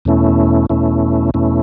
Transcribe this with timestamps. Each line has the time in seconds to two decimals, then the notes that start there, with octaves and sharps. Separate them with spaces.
0.05 E2 B2 A3 C#4 E4
0.70 E2 B2 A3 C#4 E4
1.34 E2 B2 A3 C#4 E4